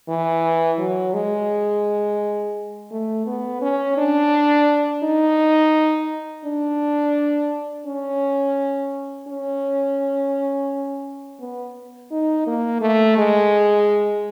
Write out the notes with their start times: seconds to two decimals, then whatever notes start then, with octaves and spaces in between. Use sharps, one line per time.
0.09 E3
0.79 F#3
1.14 G#3
2.91 A3
3.27 B3
3.61 C#4
3.98 D4
5.03 D#4
6.45 D4
7.87 C#4
9.28 C#4
11.40 B3
12.11 D#4
12.47 A#3
12.81 A3
13.17 G#3